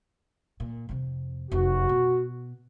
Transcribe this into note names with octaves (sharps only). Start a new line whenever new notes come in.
A#2
F2 C3
F1 F#2 F#4
B2